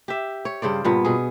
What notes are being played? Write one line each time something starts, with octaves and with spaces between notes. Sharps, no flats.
G4 E5
C#5
G2 C#3 C5 D5
G2 A#2 B3
B2 G#4